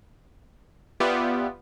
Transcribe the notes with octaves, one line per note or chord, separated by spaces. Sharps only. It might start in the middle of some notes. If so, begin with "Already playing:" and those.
B3 F4 G4 D5 E5